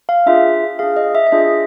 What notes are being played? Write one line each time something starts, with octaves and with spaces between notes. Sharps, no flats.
F5
D4 F4 G#4 E5
D4 F4 G#4 F5
D#5
E5
E5
D4 F4 G#4 D#5